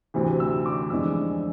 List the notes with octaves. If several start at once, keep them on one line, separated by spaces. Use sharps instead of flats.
D2 C3 E3
E6
D6
F2 E3 G#3 D4 E6